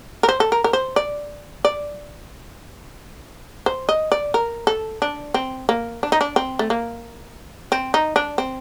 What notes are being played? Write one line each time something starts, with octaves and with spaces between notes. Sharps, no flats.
A#4
C5
A4
A#4
A#4
C5
D5
D5
C5
D#5
D5
A#4
A4
D4
C4
A#3
D4
D#4
D4
C4
A3
A#3
C4
D#4
D4
C4